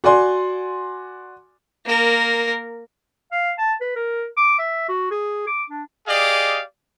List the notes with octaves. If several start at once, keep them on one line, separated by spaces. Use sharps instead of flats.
F#4 D5 G#5 C6
A#3 A#4
F5
A5
B4
A#4
D6
E5
F#4
G#4
D6
D4
G4 G#4 D5 D#5 F5